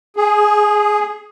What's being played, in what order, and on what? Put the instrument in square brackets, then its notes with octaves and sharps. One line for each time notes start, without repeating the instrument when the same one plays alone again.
[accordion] G#4